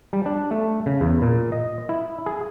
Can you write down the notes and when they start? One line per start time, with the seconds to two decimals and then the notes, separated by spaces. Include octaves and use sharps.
0.13 G3
0.26 D4
0.51 A3
0.86 C#3
1.01 E2
1.22 A#2
1.52 D#5
1.89 E4
2.26 G#4